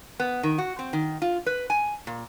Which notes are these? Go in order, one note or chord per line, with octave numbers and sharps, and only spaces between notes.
B3
D#3
F#4
C4
D#3
F4
B4
G#5
A#2